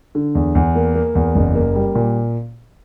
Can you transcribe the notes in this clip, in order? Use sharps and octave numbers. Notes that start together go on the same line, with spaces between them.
D3
E2
E2
A#3
A#3
E2
F#1
A#3
G3
A#2